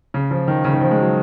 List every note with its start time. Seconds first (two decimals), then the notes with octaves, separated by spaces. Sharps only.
0.14 C#3
0.31 F3
0.48 D#3
0.65 C#3
0.73 D#3
0.81 F3
0.91 G#3
0.99 F#3